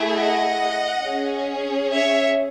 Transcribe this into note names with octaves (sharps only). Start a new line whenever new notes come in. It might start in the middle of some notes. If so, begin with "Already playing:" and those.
Already playing: A3 E4 G#4
D#5 F#5
C#4 G#4
C#5 E5